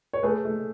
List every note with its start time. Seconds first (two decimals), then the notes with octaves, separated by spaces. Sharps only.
0.13 C#5
0.23 A3 G#4 B4
0.45 A3